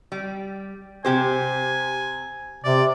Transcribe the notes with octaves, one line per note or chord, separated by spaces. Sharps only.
G3
C3 G4 C5 G#5
C3 D5